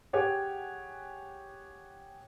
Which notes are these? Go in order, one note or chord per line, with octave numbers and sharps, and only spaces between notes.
G4 G#4 C#5 F#5 G#5